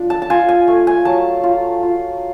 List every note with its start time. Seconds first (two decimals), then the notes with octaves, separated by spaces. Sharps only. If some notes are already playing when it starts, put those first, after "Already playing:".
Already playing: F3 D4
0.10 A5
0.22 A5
0.30 F4 G#5
0.49 G#5
0.68 A3
0.87 G#5
1.05 F#3 A5
1.43 F4
1.83 F4